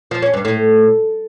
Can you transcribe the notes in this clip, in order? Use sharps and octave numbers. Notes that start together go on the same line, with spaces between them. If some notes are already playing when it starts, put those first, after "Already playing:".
F3
C#4
G2
A2